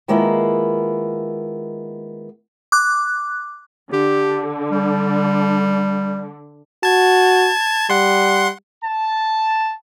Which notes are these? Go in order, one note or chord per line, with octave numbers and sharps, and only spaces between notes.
D#3 G#3 A#3 B3 E4 F4
D6 F#6
D3 G4
G3
F#4 A5 G#6
G3 F#5 C6
A5